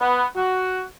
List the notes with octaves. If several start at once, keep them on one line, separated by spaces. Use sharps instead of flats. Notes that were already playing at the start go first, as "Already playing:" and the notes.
B3
F#4